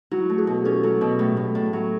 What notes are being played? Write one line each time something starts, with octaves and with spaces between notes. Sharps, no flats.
F#3 E4 F#4
A3
F#4 G#4
B2
C#4 G4 A4
F#3
B2
A2
A2
A2
F#3